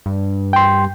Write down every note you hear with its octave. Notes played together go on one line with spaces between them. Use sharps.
G2
G5 C6